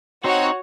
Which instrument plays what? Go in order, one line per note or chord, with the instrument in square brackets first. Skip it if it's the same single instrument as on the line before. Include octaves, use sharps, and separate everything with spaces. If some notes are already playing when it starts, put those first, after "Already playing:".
[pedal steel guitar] C4 D#4 [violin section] F#4 C#5 F#5